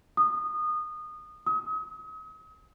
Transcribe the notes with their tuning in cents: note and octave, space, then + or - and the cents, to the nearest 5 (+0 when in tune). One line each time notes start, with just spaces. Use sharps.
D#6 -20
D#6 +40